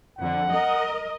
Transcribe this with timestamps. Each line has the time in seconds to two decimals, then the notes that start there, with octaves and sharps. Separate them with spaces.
0.19 F2 D3 F#5
0.51 A#4 D#5